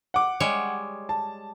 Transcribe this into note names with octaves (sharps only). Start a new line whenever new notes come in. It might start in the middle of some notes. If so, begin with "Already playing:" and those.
F#5 D6
G3 G#3 C#5
A5